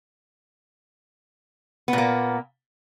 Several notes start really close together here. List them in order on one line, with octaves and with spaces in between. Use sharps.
B3 A#2 A#3